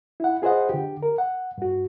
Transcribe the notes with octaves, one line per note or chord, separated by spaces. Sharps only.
E4 F#5
F4 G#4 B4 C5 D#5 F#5
D3 G4
A#4
F#5
G2 F#4